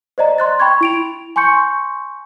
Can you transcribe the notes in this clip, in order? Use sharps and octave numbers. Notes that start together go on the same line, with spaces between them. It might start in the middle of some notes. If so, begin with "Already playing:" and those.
C5 D5 D#5 A#5
C6 F#6 A6
G5 B5 C#6 G#6
E4 D7 F7
G#5 C6 C#6 G6 C#7